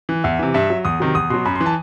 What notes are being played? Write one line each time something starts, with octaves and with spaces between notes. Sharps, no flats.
E3
E2 E5
C3 E3
G2 E5
F#3
E2 D#6
C3 D#3 F#3
E2 D#6
B2 F#3 C6
F#2 B5
C6
E3
A5